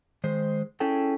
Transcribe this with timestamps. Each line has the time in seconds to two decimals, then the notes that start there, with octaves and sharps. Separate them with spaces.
0.24 D#3 G#3 C5
0.80 C#4 E4 G#4 A4 G5